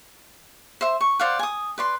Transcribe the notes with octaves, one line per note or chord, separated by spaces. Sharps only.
C5 E5
C#6
C5 D5 F5 F#5
G#5 D#6
B4 D5 C6